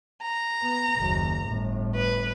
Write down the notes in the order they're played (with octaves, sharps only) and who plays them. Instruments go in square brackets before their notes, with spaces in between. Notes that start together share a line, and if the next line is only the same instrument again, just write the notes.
[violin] A#5
[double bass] B3
F#1 D#2
G1 A2
[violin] B4